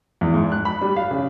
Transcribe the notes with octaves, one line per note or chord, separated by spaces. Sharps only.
E2
G#2
F#6
B5
G3
F5
C#3